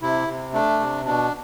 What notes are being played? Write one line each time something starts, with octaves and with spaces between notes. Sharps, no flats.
C3 E4
C3
A3 D4
C3
B2 D4